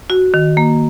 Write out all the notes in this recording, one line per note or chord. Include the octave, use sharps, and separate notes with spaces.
F#4
D#3
A#3